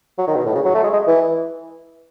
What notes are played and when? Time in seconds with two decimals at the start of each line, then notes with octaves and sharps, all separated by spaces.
0.18 F#3
0.28 D#3
0.36 B2
0.46 A2
0.55 C#3
0.65 F#3
0.75 A3
0.84 G#3
0.94 G#3
1.07 E3